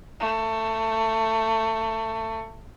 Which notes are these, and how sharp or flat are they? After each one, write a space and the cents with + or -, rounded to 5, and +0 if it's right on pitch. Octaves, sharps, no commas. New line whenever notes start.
A3 +20